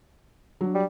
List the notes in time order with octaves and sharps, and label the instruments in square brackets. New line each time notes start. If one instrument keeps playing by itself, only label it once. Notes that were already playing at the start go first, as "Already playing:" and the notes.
[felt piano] F#3 D4
[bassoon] G3